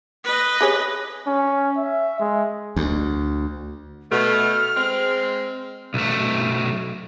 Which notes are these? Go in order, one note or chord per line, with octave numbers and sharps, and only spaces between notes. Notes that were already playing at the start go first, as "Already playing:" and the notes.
B4 D#5
G4 G#4 C#5
C#4
E5
G#3
D2
B2 A3 F6
G#3 C4
B1 A3